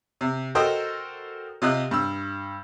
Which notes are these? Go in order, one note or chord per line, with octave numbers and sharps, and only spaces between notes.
C3
F#4 A4 A#4 C5 D#5 G5
C3 F4 D#5 F#6
G2 E6